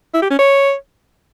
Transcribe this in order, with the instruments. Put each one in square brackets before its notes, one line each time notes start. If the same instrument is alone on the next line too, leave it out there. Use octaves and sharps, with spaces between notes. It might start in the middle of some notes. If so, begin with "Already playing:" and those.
[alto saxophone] E4
G4
C#4
C#5